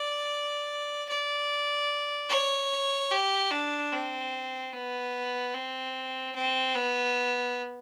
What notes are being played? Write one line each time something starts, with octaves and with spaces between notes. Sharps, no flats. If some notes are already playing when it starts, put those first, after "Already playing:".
Already playing: D5
D5
C#5
G4
D4
C4
B3
C4
C4
B3